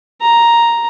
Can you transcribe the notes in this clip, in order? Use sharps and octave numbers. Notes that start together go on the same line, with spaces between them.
A#5